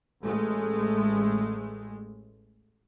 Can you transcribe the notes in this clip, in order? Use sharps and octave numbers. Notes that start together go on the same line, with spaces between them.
A1 G#3 A3